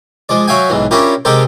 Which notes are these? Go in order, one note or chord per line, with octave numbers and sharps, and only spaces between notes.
F3 G#3 D5
F#3 F#4 E5 F5 G5 G#5
B1 G#2 E3
C#4 D4 E4 F4 G4 A#4
C3 G#3 G4 A4 A#4 C5